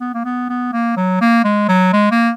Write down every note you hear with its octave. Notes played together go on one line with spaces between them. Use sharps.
B3
A#3
B3
B3
A#3
F#3
A#3
G#3
F#3
G#3
A#3